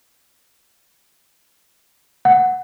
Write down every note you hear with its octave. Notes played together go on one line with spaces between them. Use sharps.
F#5